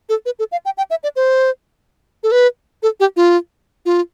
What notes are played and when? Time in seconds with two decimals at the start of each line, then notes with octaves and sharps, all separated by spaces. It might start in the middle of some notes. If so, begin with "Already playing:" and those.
0.09 A4
0.26 B4
0.39 A4
0.52 F5
0.65 G5
0.78 G5
0.90 E5
1.03 D5
1.16 C5
2.23 A4
2.32 B4
2.83 A4
3.00 G4
3.16 F4
3.86 F4